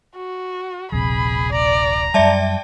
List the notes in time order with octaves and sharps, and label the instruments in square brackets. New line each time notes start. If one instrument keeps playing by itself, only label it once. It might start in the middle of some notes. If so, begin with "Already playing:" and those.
[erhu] F#4
[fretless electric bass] D#1 A#1 C3 [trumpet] G#4 [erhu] B5
[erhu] D5 [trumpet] A#5
[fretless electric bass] F#2 G3 [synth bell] D5 E5 A5 [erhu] G5